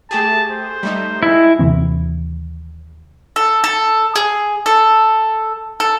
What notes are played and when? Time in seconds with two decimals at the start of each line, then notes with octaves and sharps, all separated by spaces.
0.11 A3 G4 G#4 A5
0.51 C5
0.83 G3 A3 D#4
1.23 G#3 E4
1.59 D#2 C3 E3 C4
3.36 A4
3.64 A4
4.16 G#4
4.66 A4
5.80 A4